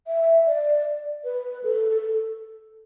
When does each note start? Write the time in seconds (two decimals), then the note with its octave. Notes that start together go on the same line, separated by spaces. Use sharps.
0.07 E5
0.46 D5
1.24 B4
1.63 A4
1.90 A4